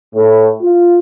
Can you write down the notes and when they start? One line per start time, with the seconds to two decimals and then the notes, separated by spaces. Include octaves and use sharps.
0.15 A2
0.62 F4